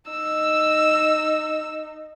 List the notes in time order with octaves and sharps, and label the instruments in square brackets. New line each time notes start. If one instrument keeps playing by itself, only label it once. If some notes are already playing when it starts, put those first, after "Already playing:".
[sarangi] D#4 [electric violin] E6